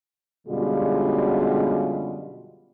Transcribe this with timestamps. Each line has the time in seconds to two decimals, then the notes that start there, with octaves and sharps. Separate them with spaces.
0.48 F#2 B2 D3 G3 G#3 F4